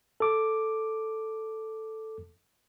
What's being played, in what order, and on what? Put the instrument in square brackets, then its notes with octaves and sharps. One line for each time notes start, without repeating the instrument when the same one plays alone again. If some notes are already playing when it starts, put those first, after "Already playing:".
[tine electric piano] A4 D6